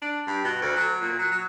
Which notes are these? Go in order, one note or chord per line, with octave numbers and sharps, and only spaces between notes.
D4
G2
B2
D2
F#3
A#2
F#3
F#3